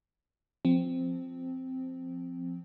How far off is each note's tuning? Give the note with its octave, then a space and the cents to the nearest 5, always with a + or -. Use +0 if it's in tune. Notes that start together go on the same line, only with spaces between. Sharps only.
F3 +0 C4 -5